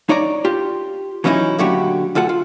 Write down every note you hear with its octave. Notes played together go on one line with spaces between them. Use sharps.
D#4 C#5 D5 A#5
F4 G4
E3 F#3 C#4 D#4 E4
A#2 D3 F#3 A3 F#4 G4
D2 F4 A4 F#5
F4